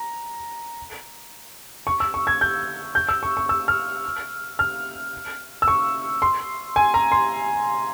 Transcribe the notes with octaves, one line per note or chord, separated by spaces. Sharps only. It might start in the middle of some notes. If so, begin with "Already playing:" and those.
Already playing: A#5
C#6
E6
C#6
G#6
G6
G6
E6
C#6
C#6
E6
F6
F6
E6
C#6
C6
G#5
A#5
C6